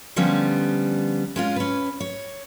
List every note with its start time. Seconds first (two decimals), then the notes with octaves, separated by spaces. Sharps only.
0.16 D3 F3 G3 B3 C#4
1.36 G#3 C#4 F4
1.56 C#4 B4
2.00 C#5